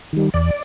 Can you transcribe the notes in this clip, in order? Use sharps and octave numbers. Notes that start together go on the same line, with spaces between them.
D#3 G3
E2 D5